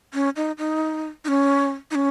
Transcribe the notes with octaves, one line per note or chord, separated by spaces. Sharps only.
C#4
D#4
D#4
D#4
C#4
D#4
C#4